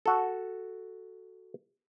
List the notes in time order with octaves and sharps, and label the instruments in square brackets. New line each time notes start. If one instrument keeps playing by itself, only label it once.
[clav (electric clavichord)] F#4 A4